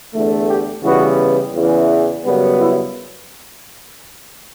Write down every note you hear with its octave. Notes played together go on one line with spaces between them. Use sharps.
E2 D3 A3
G4
C#3 E3 G3 B3 F#4
E2 C#3 E3
F#2 C#3 G3 B3
E4